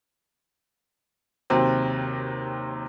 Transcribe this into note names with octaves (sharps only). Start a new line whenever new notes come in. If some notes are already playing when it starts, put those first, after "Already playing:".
D#2 C3 F#3 C4